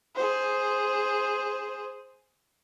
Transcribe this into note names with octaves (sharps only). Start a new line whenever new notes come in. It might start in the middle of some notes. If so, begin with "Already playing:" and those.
G#4 C5